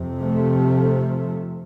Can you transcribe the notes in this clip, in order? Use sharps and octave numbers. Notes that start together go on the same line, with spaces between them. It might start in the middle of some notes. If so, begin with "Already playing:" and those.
Already playing: F2 C3
F3 A3